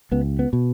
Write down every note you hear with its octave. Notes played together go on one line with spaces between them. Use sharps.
C#2 B3
B3
B2